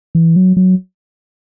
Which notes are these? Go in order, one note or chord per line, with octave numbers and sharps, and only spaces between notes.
E3
F#3
F#3